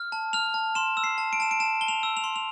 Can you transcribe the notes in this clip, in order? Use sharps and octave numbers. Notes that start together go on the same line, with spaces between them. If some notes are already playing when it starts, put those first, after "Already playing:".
Already playing: F6
A5
F6 F7
A5
C6 E7
E6
C7
A5
D7
A5 E7
D7
A5 E7
A5 G7
F7
E6
F7
C6
F7